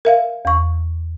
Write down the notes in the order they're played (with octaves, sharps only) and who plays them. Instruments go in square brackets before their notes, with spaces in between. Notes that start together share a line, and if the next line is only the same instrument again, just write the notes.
[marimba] A#4 E5 F5
E2 C#6